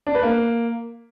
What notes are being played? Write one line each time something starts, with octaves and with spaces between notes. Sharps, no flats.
D4
B4
A#3